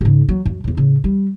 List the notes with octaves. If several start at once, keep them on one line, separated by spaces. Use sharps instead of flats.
G#2 C#3
F#3
F#2
E2 A2
A2 C#3
G3